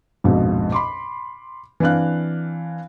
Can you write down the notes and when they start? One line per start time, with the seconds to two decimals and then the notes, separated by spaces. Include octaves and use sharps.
0.24 A#1 F2 G#2 B2
0.72 B5 C6 D6
1.80 E3 C4 D4 F5 F#6